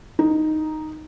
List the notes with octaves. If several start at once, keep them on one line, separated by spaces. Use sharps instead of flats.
D#4